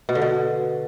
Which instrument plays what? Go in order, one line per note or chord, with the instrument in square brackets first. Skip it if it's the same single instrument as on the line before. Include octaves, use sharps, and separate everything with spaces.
[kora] B2
D3
B2